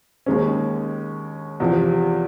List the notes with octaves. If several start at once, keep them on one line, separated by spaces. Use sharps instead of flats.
D#2 D#3 G#3 C#4
E2 C3 F3